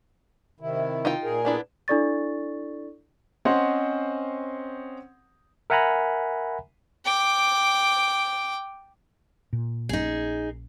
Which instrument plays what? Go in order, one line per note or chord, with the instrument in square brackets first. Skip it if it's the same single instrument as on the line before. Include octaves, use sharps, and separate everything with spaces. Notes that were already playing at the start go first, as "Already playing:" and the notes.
[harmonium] C3 D#3 E4
[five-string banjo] D#4 F4 G5
[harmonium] A#2 G#4 A#4
[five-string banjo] B3 D4 E4
[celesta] D4 E4 A4 D5 C#6 A6
[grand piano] C4 C#4 C5 D#5 F#5 C6
[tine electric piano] A#4 E5 F#5 G#5 A#5 B5
[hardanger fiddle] G5 D6
[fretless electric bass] A#2
[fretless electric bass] A#1 A#3 C#4 [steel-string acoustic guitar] D#4 G#4